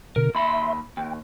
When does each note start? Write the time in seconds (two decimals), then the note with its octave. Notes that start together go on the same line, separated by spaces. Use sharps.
0.16 B2 D3 A#4
0.35 D#2 E5 B5 C6
0.97 D#2 G5